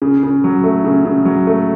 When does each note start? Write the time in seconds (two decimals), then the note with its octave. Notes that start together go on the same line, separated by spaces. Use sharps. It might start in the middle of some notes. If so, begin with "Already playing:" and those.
0.02 C#3
0.23 C#3
0.44 F#3
0.64 A3
0.84 C#3
1.05 C#3
1.25 F#3
1.47 A3